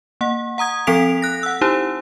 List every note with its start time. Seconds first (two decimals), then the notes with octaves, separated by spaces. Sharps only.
0.21 A#3 F#5
0.58 F#5 A#5 D#6 G#6
0.87 F3 C4 A4 B6 D7 F7
1.22 F#6 A#6
1.43 F#5 E6
1.61 D#4 E4 G4 C5